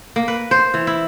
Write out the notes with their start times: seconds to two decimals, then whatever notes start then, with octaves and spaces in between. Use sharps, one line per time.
0.16 A#3
0.28 B4
0.51 C5
0.74 E3
0.87 E4